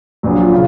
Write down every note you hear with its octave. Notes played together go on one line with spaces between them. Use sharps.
A#1 A#2 F#3
F4
C#3